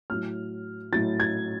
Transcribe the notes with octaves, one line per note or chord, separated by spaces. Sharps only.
A2 F#3 F6
A2 F#3 A6
G#6